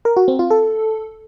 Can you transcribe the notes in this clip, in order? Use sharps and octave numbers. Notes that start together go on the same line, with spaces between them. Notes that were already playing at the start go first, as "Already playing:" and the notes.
A#4
F#4
C4
F4
A4